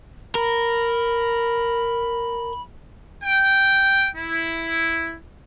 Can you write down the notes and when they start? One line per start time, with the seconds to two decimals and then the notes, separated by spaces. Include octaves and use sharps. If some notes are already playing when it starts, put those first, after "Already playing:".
0.35 A#4 B5
3.24 G5
4.16 E4